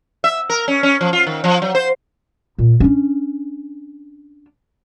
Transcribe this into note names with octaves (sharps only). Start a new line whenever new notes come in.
E5
A#4
C#4
C#4
F3
F4
D#3
F3
F#3
C5
A#2
C#4 D4